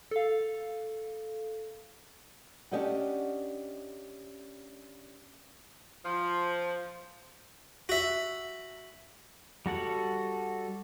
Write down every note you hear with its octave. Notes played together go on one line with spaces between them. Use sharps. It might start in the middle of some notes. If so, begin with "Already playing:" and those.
A4 F5
C#4 D4 G4 D#5 E5 F#5
F3
F#4 E5
G3 F#4 A4 F#5